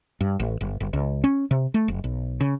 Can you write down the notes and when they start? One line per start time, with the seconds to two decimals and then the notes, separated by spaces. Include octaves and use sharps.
0.21 G2
0.40 A1
0.61 G1
0.80 G1
0.93 C#2
1.24 C#4
1.51 C3
1.74 A3
1.88 F#1
2.04 B1
2.41 C#3